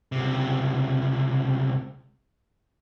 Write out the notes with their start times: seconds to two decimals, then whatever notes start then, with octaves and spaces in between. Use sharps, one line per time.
0.12 C#2 C3